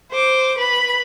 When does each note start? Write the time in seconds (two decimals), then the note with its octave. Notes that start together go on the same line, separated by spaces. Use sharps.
0.11 C5 D6
0.57 B4 B5